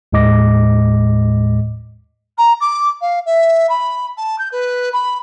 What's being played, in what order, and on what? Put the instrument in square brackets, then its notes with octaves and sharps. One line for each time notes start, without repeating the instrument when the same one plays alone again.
[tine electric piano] D#2 A2 G#3 D#5 D6 A#6
[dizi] A#5
D6
F5
E5
B5
A5
G6
B4
B5